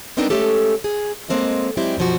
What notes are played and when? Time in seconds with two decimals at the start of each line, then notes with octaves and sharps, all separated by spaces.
0.17 G#3 B3 C4 D4 D#4 A#4
0.30 G#3 A3 C#4 G4 A4
0.84 G#4
1.29 G#3 A#3 C4 A4 C#5 D#5
1.77 F#3 G#3 C4 E4 G4 D5
1.97 F#2 B2 F3 F#4